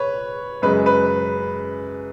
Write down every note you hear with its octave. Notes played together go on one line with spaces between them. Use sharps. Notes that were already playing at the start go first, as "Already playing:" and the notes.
Already playing: B4 C#5
F#2 C#3 G#3 B4
B4